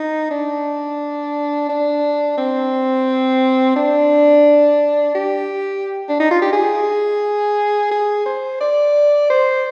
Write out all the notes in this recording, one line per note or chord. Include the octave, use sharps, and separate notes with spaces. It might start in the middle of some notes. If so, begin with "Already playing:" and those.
Already playing: D#4
D4
D4
C4
D4
G4
D4
D#4
F4
G4
G#4
G#4
C5
D5
C5